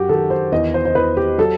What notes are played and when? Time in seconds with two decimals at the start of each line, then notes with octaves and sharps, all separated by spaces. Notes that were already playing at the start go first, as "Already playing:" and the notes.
Already playing: F#2 F#4 G4
0.09 D#3 A4
0.30 C5
0.52 E2 D#5
0.74 C5
0.85 C5
0.95 E2 B4
1.17 G4
1.38 F#3 A4